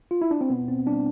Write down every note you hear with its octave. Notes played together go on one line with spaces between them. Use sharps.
F4
E4
D4
C4
B2 B3
C4
G3 D4